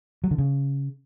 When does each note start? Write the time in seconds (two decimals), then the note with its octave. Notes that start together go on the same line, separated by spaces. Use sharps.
0.24 F#3
0.31 D3
0.38 C#3